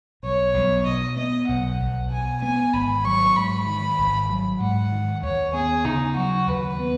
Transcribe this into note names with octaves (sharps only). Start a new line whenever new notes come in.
B1 C#5
B1
B2 D#5
B3 D#5
B1 F#5
B1
B2 G#5
B3 G#5
G#1 B5
F#3 C#6
G#2 B5
D#3
G#1
F#3
G#2 F#5
D#3
D#2 C#5
B3 G#4
C#3 D#4
F#3 F#4
D#2 B4
B3